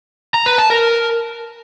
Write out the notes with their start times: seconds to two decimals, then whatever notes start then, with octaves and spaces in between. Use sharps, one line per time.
0.34 A#5
0.46 B4
0.58 A5
0.70 A#4